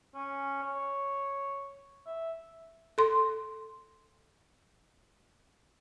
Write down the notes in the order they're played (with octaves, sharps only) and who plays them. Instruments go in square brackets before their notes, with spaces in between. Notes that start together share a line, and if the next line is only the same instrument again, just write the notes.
[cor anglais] C#4
C#5
E5
[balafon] A4 C6